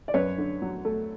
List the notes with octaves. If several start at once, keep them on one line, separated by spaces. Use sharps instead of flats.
D5
F#2 B4 C#5
D3
F#3
A3